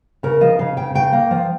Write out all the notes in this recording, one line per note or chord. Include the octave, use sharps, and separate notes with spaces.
C#3 A#4
F3 D#5
C#3 F5
C#3 G5
C#3 G5
A#3
F3